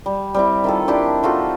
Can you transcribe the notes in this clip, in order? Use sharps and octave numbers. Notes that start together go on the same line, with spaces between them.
G3
G3 C4 E4
D#3 F4 A4
D4 E4 G4 A#4
D#4 F4 F#4 A4